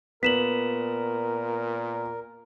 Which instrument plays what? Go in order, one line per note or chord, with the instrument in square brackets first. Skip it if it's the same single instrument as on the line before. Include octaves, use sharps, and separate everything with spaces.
[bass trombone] A#2 [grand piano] B3 [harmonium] A#4 [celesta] B6 E7 F#7